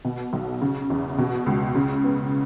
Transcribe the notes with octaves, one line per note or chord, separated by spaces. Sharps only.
B2
B1
C#3
E2
B2
C#2
C#3
B3